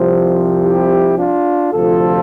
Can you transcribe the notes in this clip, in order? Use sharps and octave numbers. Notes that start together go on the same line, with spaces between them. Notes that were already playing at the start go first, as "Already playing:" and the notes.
Already playing: C2 C3 F3
E4 G4
D4 F4
D2 C3 F3 F4 A4